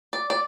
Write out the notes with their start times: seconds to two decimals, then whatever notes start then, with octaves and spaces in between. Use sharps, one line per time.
0.13 D5
0.30 D5